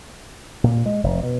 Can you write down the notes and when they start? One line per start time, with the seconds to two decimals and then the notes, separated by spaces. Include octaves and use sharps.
0.64 A#2
0.86 G#3
1.04 F1
1.23 B2